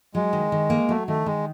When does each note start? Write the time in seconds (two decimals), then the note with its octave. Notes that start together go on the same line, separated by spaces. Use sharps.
0.15 F#3 G#3
0.33 D#3
0.52 D#3
0.70 A#3
0.89 F#3 A3
1.07 D#3 A3
1.26 D#3 G#3